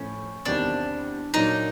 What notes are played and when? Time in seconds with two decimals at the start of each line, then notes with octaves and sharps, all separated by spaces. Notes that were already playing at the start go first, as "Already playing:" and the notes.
Already playing: A2 F3 A3 C#4
0.45 E2 C3 D#3 G3 C4 D4
1.34 A#2 F#3 A#3 D4 D#4